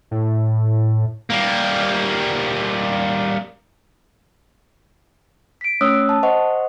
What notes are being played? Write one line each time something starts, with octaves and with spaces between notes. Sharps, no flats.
A2
G3 A#3
B6 D7
A3 C#4 C#5 D#6 E6 F#6
A5
C5 D#5 F#5 C#6